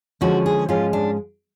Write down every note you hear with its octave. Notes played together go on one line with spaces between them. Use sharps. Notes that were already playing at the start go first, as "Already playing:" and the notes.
D3 F3 G#3 C#4 F#4
G#4
G#2 F3 G#3 C#4 F4
D4